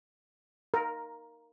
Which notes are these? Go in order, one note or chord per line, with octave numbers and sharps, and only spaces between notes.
A#4